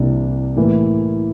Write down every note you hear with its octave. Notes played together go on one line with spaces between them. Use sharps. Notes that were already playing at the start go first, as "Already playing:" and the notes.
Already playing: C2 C3 E3 A#3 D4
A2 E3 A#3